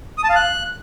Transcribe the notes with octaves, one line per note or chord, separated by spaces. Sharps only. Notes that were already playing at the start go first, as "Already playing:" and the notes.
D#6
A5
F5
F#6